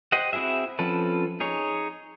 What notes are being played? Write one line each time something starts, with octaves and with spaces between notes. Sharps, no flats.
G4 C5 D#5 F#5
C4 E4 F#4 G#4 E5
F3 C4 C#4 A4 B4
D#4 G#4 C#5